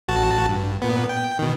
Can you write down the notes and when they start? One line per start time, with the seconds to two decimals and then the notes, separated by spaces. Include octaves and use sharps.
0.08 A1 F#4 A5
0.49 G2
0.82 A#2 B3
1.09 G5
1.39 B2 D#3